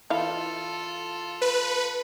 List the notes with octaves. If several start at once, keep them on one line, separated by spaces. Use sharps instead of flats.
E3 E4 F4 A4 F5
B4